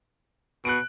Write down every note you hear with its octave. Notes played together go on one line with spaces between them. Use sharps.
B2 F#6 D7